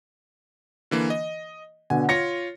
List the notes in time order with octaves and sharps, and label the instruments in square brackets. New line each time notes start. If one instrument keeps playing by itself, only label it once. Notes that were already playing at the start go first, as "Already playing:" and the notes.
[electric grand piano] D3 E3 A#3
D#5
[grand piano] B2 D3 [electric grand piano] G#5
[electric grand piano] F4 C#5 C#7 [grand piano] A#6